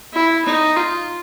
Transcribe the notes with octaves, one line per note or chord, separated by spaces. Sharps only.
E4
D#4
F4